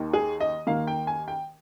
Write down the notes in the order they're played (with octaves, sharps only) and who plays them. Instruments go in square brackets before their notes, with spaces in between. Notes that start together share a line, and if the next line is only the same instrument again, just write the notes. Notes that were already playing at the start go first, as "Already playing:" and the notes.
Already playing: [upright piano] D#2 D#3 A#3
G#4
D#5
D#2 D#3 A#3 F5
G5
G#5
G5